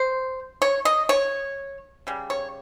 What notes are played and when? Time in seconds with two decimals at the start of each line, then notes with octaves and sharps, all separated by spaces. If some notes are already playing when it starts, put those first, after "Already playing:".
Already playing: C5
0.62 C#5
0.85 D#5
1.09 C#5
2.07 C#3 G3
2.30 C#5